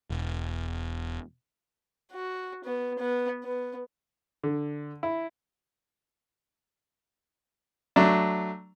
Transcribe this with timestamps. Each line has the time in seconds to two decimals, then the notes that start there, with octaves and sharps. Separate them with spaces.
0.10 E1
2.12 F#4
2.65 B3
2.99 B3
3.43 B3
4.43 D3
5.03 E4
7.96 F#3 A3 D4